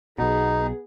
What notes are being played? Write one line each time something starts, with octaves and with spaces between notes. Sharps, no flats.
B1 B2 B3 D#4 G#4